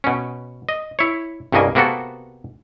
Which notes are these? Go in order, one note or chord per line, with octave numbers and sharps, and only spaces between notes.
B2 C#4
D#5
E4 C#5
C2 G2 C#3 A#3 D#5 G#5
C3 A#3 B3 F#4 A4